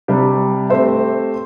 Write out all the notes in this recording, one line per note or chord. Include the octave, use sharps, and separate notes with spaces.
C3 G3 D4 G4
A3 C4 G4 C5 E5